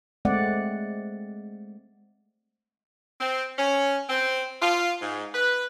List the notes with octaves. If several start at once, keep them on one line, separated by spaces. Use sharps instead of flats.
G#3 A3 C4 D5 F#5
C4
C#4
C4
F4
G#2
B4